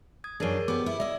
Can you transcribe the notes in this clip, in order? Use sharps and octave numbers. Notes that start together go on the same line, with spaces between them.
D#6 G#6
F#2 D4 G#4 A#4 C#5
B3 G4 D6
E4
E4 D5 D#5